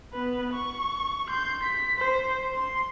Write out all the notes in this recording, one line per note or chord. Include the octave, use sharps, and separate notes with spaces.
B3 B4
C#6
C6 G6
B6
C5
C6